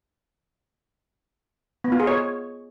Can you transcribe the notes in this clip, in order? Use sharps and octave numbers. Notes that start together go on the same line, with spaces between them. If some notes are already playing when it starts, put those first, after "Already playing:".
B3
F4
G#4
C#5